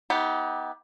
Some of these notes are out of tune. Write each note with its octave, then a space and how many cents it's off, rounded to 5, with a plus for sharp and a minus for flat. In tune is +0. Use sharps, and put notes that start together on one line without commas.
B3 +0 D#4 +35 G4 +0